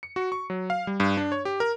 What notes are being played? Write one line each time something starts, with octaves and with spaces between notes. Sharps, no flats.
C#7
F#4
C#6
F#3
F5
G3
G2
D4
C#5
G4
A#4